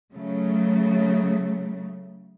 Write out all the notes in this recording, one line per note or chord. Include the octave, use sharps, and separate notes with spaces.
C#3 F#3 A3